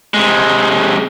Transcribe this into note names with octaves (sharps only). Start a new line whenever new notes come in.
C3 G#3